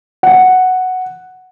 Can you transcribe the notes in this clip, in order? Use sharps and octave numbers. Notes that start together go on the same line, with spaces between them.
F#5